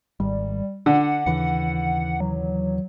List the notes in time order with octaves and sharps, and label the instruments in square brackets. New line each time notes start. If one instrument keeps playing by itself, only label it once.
[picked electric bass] G#1 [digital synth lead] G3
[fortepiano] D3 [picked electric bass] D4 [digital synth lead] F#5
[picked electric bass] D#2 C#3 E3 [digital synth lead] F#5
[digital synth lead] F#3